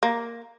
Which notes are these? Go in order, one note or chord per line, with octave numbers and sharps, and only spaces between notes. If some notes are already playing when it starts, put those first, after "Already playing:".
A#3